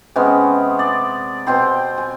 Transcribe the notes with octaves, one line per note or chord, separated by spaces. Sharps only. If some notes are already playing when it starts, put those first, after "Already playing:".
C3 G#3 B3 C#4
D5
B2 C4 G5 C6
G#5